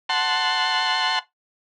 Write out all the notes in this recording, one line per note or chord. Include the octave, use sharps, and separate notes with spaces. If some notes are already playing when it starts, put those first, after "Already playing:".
F#5 A5 C6